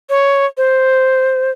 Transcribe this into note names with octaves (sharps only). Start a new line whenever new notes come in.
C#5
C5